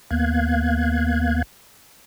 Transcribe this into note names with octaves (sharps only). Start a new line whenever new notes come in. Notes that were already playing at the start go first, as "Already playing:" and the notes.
D#2 A#3 B3 F5 F#6 G#6